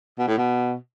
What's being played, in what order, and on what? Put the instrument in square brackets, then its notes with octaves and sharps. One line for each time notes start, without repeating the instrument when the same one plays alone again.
[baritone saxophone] B2
A2
B2